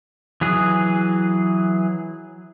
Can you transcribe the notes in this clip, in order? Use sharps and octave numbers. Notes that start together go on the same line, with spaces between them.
E3 F#3 G#4